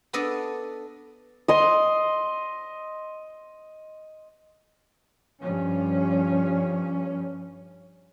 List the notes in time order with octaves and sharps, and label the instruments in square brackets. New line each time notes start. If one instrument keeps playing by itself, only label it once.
[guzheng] B3 D4 A4 D#5
[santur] D#5 C6
[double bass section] G2 F3 C#4